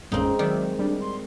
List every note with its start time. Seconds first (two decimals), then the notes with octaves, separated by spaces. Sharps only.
0.12 A1 F2 A#2 G#3 C4 C#4 D#4
0.39 D#3 F#3 D5 E5
0.79 G3 D4
1.01 C6